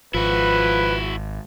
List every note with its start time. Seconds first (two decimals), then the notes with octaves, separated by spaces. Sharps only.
0.14 G#1 F3 E4 F#4 B4